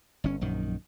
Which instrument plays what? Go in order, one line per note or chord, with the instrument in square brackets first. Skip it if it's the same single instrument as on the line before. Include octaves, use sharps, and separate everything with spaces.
[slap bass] G1 C#4
A#1 F#2 D#3